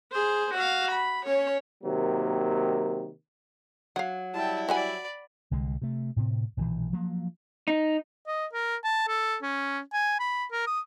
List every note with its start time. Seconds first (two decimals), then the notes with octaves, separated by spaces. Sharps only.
0.12 G#4 C5
0.54 F#4 F5
0.91 B5
1.25 C#4 C#5
1.84 C3 D#3 F#3 A#3
3.96 F#3 F5 F#5
4.34 G3 E4 G5 A5
4.69 F#4 D5 F#5 G#5 B5
5.51 C2 D3 G#3
5.82 C3 A3
6.16 A2 C3 C4
6.57 B1 A#2 D#3 E3
6.93 F3 F#3 A#3
7.68 D#4
8.27 D#5
8.53 A#4
8.84 A5
9.07 A4
9.42 C#4
9.93 G#5
10.20 B5
10.52 A#4
10.67 D#6